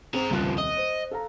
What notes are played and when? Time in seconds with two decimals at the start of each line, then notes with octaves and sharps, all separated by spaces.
0.14 C4 G#4 A#5
0.30 D#1 C2 C#3 F3 F#6
0.58 D#5
0.77 C5
1.11 A4 F5 A#5